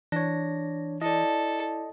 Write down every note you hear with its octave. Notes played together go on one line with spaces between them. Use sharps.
E3 D4 C#5 A#6
E4 A4 D5 D#5